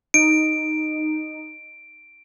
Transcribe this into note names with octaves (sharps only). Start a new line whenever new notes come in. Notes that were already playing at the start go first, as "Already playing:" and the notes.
D#4 D7